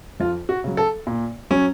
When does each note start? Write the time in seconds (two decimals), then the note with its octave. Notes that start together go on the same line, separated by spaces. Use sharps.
0.20 F2 F4
0.49 F#4
0.64 C#3 F#3
0.77 A4
1.07 A#2
1.50 F#3 C#4